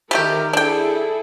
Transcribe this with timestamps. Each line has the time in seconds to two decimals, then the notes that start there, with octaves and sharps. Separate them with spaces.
0.11 D#3 G3 A3 G4 A#4
0.53 D4 E4 G#4 A4 G5